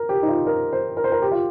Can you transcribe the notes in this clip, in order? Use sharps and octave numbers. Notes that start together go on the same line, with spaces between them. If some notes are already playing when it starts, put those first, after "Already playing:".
Already playing: A#4
G4
D#4
F4
A#4
C5
A#4
C5
A#4
G4
F4